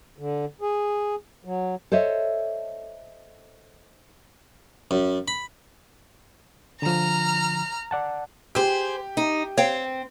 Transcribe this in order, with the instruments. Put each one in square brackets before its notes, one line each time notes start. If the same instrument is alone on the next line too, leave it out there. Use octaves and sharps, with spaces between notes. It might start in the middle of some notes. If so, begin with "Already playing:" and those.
[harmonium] D3
G#4
F#3
[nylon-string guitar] A4 C5 C#5 D#5 E5
[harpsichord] F#2
B5
[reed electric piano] D3 F3 [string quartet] A#5 F6
[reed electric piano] D5 F#5 A5
[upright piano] G4 [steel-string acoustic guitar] G#4 C5
[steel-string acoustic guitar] D#4
[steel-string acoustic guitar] C4 [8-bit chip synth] C#5 F5 G5